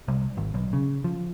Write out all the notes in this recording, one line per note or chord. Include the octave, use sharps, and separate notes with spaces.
C2
G#1
B1
C#3
F3